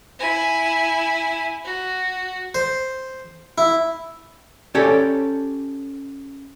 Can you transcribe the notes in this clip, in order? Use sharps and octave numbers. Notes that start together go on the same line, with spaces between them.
E4 G#5
F#4
C5
E4
C#4 G4 A4 C#5 D5